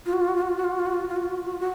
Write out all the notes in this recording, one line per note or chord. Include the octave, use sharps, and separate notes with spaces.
F4
F#4
F4
F#4
F4
F#4
F4
F#4
F4
F#4
F4
F#4
F4
F#4
F4
F#4
F4
F#4
F4
F#4
F4
F#4